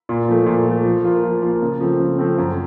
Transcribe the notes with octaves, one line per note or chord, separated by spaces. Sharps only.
A#2
F3 A3
A#2
F3
A3
F3
A#3 F4
F3
A#3 F4
C#3
F3 A3 C4
C#3
F3 A3 C4
F#2